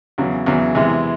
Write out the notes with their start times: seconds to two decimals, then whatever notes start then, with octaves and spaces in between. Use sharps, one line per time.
0.18 E2 C#3 F#3
0.46 E2 C#3 F#3
0.75 E2 C3 E3 G#3